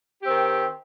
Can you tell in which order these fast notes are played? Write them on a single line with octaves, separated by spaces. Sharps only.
G4 C4 D#3